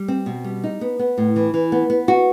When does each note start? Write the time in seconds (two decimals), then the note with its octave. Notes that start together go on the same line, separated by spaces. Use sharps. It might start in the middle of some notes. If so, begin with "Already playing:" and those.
Already playing: G3
0.08 C4
0.26 B2
0.44 G3
0.64 D#4
0.81 B3
0.99 B3
1.18 A2
1.36 E3
1.54 E3
1.72 B3
1.90 B3
2.08 F#4